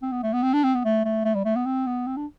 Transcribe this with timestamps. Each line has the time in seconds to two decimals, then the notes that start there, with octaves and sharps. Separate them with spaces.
0.02 C4
0.12 B3
0.23 A3
0.33 B3
0.43 C4
0.53 D4
0.64 C4
0.74 B3
0.85 A3
1.05 A3
1.25 A3
1.35 G3
1.45 A3
1.56 B3
1.66 C4
1.87 B3
2.07 C4
2.17 D4